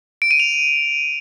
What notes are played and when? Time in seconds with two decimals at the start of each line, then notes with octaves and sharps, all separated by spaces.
0.22 D7
0.31 D#7
0.40 F7